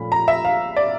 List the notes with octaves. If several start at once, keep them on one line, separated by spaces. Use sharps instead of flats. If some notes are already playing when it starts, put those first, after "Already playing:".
Already playing: A#2 F3 A3 C#4 B5
A#5
E5
F5
D5